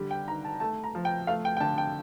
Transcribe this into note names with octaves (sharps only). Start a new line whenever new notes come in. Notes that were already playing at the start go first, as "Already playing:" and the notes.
Already playing: D3 G3
G5
D#3 A#5
A5
A3 A5
A#5
F3
G5
A3 F5
G5
G5
D3 A5
G5